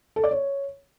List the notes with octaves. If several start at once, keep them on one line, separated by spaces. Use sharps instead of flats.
A4
D5
C#5